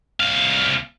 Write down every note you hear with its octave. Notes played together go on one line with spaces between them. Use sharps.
C2 F5